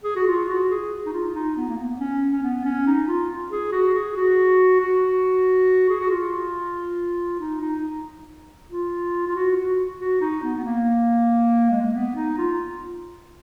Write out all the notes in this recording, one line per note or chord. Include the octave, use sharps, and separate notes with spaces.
G#4
F#4
F4
F#4
G#4
D#4
F4
D#4
B3
A#3
B3
C#4
C#4
B3
C#4
D#4
F4
G#4
F#4
G#4
F#4
F#4
G#4
F#4
F4
D#4
D#4
F4
F4
F#4
F#4
F#4
D#4
B3
B3
A#3
G#3
A#3
B3
D#4
F4